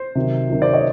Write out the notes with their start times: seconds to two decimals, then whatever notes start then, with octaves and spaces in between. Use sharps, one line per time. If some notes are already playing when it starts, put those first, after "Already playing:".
Already playing: C5
0.15 C3 D#3 F#3
0.50 C3 D#3 F#3
0.62 C5 D5
0.73 C#5 D#5